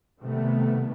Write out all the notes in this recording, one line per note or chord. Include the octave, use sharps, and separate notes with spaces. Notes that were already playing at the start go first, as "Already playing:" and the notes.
C3 D#3 G3 A3 B3